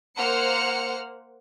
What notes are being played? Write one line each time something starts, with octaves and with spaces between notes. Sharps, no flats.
A#3 C5 F#5 F6 C#7